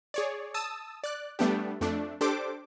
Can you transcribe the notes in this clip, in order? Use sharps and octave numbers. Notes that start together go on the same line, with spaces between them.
G#4 C#5 D5
A5 D#6 E6
D5 F#6
G3 A3 B3 D4 G4
F2 A3 D4
D4 G4 A4 C5 D6